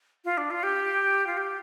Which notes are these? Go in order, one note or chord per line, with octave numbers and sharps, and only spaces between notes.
F4
D4
F4
G4
F4
G4